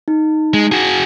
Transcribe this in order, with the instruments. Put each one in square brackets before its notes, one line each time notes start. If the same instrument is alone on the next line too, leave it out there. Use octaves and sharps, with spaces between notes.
[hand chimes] D#4
[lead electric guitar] G#3
F#4 G#4